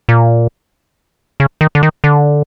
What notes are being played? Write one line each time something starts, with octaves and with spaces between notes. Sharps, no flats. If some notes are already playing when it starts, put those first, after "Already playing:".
A#2
C#3
D#3
D3
D#3
D3